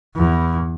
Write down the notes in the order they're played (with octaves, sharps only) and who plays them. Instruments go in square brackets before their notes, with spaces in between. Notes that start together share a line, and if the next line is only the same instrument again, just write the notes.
[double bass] E2